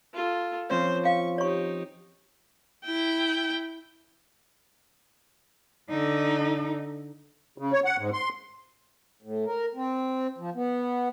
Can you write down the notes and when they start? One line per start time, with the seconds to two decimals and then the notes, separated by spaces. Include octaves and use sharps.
0.14 F4 A4
0.70 F3 C4 C#4 C5 C#5
1.05 F5 C#6
1.38 D#4 G4 C#5 C#6
2.86 E4 G5
5.90 D3 D#4
7.58 C#3
7.73 C#5
7.85 F#5
7.98 G#2
8.13 C6
9.22 A2
9.46 A#4
9.75 C4
10.38 F3
10.55 B3